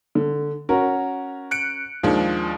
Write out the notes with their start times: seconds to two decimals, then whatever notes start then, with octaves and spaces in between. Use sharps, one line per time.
0.15 D3
0.69 C#4 F#4 A#4
1.51 F#6 C#7 D7
2.03 D#2 F3 G#3 D4